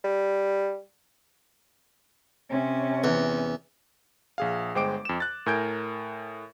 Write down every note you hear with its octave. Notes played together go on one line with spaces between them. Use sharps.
G3
C3 C#4
E2
A#1 G#4 F5
G1 G#3 C5 G5 D6 D7
F2 E7
F#6 A6
A2 A#4 G#5 G6 G#6 D7